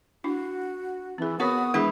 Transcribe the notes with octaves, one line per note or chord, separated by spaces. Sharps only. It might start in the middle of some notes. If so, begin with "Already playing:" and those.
D4 E4 F#4
E3 C4 G#4
B3 C4 F#4 A#4 C#5 D#6
E3 G#3 D4 G#4